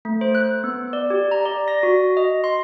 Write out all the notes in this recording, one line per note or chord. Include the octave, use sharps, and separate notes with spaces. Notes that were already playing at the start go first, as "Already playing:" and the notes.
A3
C5
F#6
B3
D5
G4
A#5
D5
A#6
F#4
D#5
C6